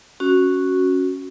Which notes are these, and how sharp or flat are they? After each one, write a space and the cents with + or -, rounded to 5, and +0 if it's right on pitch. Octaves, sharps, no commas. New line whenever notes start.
C#4 +0 F#4 +0